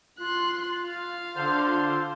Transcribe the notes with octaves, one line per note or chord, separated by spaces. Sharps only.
F4 C6 F#6
F5
D3 C5